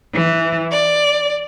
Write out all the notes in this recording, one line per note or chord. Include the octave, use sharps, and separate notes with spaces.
E3
D5